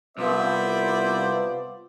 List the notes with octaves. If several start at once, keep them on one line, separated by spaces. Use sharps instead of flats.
C2 B3 F4 C5 D5 E5